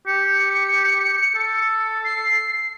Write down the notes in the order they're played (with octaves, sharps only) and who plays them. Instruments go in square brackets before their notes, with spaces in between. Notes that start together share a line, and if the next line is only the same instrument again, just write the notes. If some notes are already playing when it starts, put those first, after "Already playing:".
[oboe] G4 [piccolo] C#7
[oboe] A4
[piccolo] C7